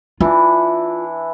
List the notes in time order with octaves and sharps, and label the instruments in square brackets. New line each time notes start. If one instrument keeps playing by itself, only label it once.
[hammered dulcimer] E3 D4 [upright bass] F4